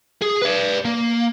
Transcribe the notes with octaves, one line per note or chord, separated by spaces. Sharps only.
G#4
B4 D5
A#3